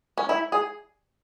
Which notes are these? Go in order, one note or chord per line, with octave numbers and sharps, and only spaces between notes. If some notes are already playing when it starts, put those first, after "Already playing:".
C#4
E4
G#4